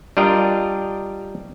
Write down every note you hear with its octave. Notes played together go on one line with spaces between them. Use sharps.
G3 D4 F4 A#4 D#5 G5